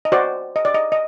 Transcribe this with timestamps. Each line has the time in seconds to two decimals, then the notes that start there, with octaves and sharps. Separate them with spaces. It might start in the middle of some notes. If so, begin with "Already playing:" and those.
0.05 D#5
0.12 F#4 C5 D5
0.56 D#5
0.65 D5
0.74 D#5
0.92 D#5